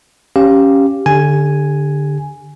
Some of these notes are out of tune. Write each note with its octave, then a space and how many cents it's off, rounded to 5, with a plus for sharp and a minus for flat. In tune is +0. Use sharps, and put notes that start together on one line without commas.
C#4 +0 G4 +0 F5 +0
D3 +0 G4 +25 G#5 +0